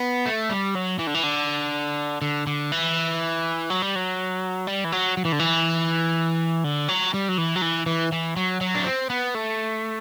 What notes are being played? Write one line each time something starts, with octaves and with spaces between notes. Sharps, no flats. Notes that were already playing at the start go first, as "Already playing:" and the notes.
Already playing: B3
A3
G3
F#3
E3
D3
E3
D3
D3
D3
E3
F#3
G3
F#3
G3
E3
F#3
F#3
E3
D3
E3
D3
F#3
G3
F#3
E3
F#3
E3
E3
E3
F#3
F#3
D4
C4
B3
A3